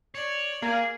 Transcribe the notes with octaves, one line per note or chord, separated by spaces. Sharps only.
C#5 D5
A#3 G#4